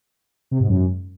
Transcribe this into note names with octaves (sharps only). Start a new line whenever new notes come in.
C3
G#2
F#2